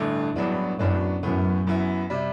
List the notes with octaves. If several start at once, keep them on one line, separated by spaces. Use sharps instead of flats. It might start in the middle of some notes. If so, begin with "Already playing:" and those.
Already playing: A1 G2 D3 A3
A1 E2 G2 F#3 B3 D4
F#2 A2 F#3 B3 D4
F#2 A2 E3 B3
F#2 E3 B3 E4
C3 G3